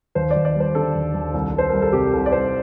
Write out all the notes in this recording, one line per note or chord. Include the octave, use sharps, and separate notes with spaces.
D#2 C5
D5
D#2
D5
G3 C5
D3 A4
D#2
D#2
C2
C2
C5
G3 A#4
A4
C3 G4
C2 A4
D5
C2 C5